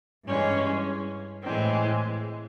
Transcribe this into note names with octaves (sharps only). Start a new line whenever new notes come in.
G2 E3 G#3 C#4
A2 E3 G#3 C4